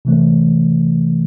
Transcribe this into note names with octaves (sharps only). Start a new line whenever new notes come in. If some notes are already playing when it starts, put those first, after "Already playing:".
C3 E3 A3